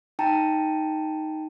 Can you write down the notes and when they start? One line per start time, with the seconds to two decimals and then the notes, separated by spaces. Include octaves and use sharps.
0.19 D#4 G5 A5 A#5